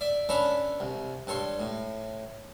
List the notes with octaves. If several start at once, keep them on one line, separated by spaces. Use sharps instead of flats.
D5 E5
C#4 D4 A4 B4 E5 A#5
C2
G2 A4 C#5 C6
A2